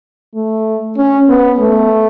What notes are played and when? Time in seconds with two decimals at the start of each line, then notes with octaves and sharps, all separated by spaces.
0.35 A3
0.97 C#4
1.29 B3
1.60 A3